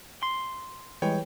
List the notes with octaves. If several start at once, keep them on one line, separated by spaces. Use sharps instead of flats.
C6
E3 G3 G#3 B4 C#5 G5